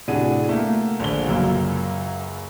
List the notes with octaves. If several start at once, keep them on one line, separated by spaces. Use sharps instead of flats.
A2 C3 D4 F#4 G#4 D#7
A3 A#3
A#1 D3 G7
C#2 F#2 F#3 A#3 E6